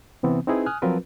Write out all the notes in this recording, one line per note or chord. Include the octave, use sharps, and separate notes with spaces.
C3 E3 B3 C4
C4 D#4 E4 G#4 B4
G#5 D#6 F6 F#6
F3 F#3 C4 F4 A#4 B4